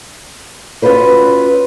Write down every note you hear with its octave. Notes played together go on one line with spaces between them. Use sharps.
C#4 F4 F#4 B4 C5